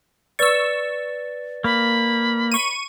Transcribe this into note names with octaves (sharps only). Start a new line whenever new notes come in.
B4 D5 C#6 E6 A6
A#3 B5
C#6 D#7